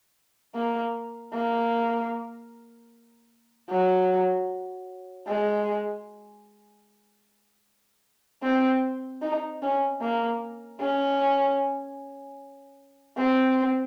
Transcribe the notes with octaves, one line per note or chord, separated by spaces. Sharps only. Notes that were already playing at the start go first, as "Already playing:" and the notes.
A#3
A#3
F#3
G#3
C4
D#4
C#4
A#3
C#4
C4